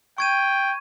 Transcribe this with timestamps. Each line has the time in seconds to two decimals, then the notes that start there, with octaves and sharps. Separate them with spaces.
0.18 G5 C#6 G#6 D#7